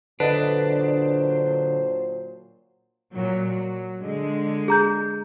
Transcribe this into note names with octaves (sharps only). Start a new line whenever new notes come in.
A#2 D3 F#3 D4 B4 C5 D#5
A#2 F#3
F#3
D3 G#3
G#4 A#5 G6